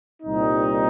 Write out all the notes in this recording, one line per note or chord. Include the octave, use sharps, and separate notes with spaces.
C2 A#2 G3 C4 D#4